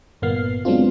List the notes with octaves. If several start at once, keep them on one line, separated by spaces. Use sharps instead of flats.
G1 A#2 A#3 B3 F6 C7
F#3 G#3 B3 C4 D4 F4